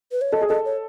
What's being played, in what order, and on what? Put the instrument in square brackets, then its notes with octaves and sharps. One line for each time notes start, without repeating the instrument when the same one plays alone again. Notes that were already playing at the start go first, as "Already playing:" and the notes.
[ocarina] B4
C#5
[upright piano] A4 [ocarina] D#5
[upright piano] G#4
[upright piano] A4 [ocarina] D#5
[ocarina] C#5